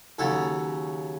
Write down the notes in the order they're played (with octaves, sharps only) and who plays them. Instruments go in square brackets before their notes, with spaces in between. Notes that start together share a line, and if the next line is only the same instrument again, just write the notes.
[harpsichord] D#2 C#3 F#3 A4